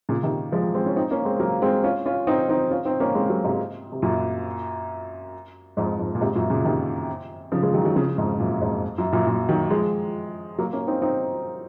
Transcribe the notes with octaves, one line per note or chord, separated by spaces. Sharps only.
A#2 C#3
C3 D#3
F3 G#3
G#3 C4
C#4
C4 D#4
A#3 C#4
G#3 C4
F#3 A#3
G#3 C4
C#4 F4
C#4 F4
C4 D#4
C4 D#4
C#4 F4
C4 D#4
A#3 C#4
G#3 C4
F#3 A#3
G#2 C3
C3
F#2 A#2
F2 G#2
F2 G#2
A#2
G#2 C3
F#2 A#2
A#2 C#3
C3 D#3
C#3 F3
F3 G#3
D#3 F#3
D#3 F#3
C#3 F3
F2 G#2
F#2 A#2
F2 G#2
F#2
F#2 A#2
F#2 A#2
D#3 F#3
F3 G#3
F#3 A#3
A#3 C#4
C4 D#4
C4 D#4